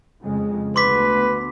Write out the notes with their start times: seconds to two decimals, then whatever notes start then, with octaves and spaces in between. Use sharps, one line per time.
0.22 F2 C#3 G#3
0.76 D2 B3 B4 C6 D6 B6